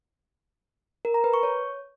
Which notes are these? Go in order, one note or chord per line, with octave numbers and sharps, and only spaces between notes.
A#4
A#5
B4
C#6
C#5